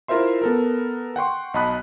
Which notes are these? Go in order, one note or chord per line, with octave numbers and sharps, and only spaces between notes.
E4 F4 A#4 C5 E5 C6
B3 A4 A#4
F#5 G5 C6 C#6
B1 D#5 A5 B5 D#6 F#6